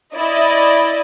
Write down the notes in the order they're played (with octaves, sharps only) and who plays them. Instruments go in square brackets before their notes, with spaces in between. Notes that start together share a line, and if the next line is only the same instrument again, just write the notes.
[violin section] E4 D5 D#5